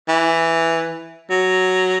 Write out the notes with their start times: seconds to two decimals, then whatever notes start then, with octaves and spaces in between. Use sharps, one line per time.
0.09 E3
1.30 F#3